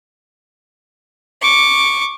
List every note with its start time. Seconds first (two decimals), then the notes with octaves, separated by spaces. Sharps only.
1.42 C#6 D6